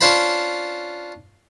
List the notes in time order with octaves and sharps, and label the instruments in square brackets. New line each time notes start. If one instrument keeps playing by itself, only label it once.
[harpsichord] C#4 D4 F4 C5 A5 B5